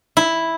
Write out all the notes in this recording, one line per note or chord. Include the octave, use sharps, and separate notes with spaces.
E4